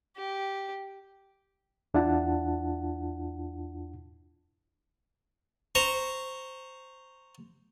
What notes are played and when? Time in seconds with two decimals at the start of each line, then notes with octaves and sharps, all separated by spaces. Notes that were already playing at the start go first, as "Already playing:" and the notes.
0.17 G4
1.94 E2 D4 E4 F4 F#5 A5
5.75 C5 A#5 C#6